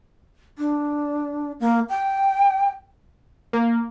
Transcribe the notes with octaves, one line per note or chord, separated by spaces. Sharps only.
D4
A#3
G5
A#3